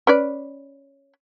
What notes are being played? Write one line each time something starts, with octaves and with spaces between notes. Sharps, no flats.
C#4 B4 D5